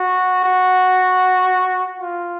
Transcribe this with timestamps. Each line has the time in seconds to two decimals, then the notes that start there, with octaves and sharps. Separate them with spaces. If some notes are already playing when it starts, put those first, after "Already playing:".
Already playing: F#4
0.44 F#4
2.00 F4